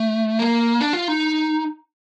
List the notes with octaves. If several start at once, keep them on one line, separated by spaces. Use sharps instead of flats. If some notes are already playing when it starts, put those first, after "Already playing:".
Already playing: A3
A#3
D4
F4
D#4